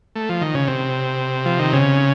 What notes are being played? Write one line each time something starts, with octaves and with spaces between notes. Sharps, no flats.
A3
F3
D#3
C#3
C3
F3
D#3
C#3